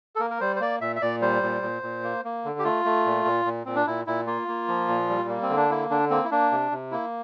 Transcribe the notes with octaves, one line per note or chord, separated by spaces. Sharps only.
A4
A#3 A#4
A#4
G3 C5
C5
A#3 D5
A#2 E5
E5
A#2 D5
G3 C5
A#2
A#2
A#2
A#3
A#3
D3
G4
A3 F4
A3
A#2
A#2
A#2
A#2 C4
D4
A#2 E4
A#2 E4
A#3 F4
A#3
F3
A#2
G3
A#3
C4
D3
D4
A#3 E4
D3 D4
A#3 C4
E4
A#3 D4
C3
C3
A#3 E4